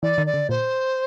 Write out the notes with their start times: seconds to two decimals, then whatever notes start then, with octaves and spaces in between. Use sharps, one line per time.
0.02 E3 D5
0.18 D#3
0.26 D5
0.34 D3
0.49 A#2 C5